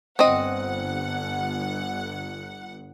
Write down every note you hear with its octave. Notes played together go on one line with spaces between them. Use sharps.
G1 C4 D#5 F#5